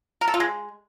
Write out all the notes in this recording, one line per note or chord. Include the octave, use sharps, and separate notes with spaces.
A#4
A4
F4
G#3